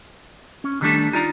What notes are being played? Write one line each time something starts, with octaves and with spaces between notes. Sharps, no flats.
C#4
D3 D#3 G3 A3 D4 A4
D#4 F4 D5 A#5